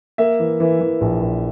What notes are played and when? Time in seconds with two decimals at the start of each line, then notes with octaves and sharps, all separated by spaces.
0.18 A#3 E5
0.39 E3
0.60 E3
0.80 E3
1.01 A#1
1.22 A#1